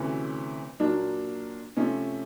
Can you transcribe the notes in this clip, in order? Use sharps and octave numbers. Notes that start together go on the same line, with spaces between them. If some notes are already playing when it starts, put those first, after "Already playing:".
Already playing: D2 C3 E3 A3 C#4
A#2 F#3 A#3 D4
C3 F3 A3 C#4